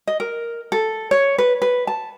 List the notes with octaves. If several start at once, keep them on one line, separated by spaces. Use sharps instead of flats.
D#5
A#4
A4
C#5
B4
B4
A5